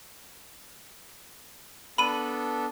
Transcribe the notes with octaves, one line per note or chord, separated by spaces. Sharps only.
B3 D4 A4 B5 D#7